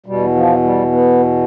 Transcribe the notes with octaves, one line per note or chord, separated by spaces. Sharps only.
E2 B2 G3
F3
G3
B3